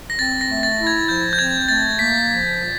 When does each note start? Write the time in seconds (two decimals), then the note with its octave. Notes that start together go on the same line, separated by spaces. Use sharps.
0.10 A#6
0.19 C4 A6
0.41 A#6
0.49 A3
0.63 A6
0.79 E4
0.87 G#6
1.08 F3 G6
1.33 G6
1.39 C4 G#6
1.68 A3 A6
1.98 A#3 B6
2.29 F3
2.58 A#2